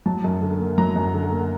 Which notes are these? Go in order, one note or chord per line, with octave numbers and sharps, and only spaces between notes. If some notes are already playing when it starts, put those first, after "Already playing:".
F#3 A5
F#2
D3
A#3
F#3 A#5
F#2
D3
A#3